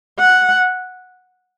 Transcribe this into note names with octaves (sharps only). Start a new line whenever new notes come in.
F#5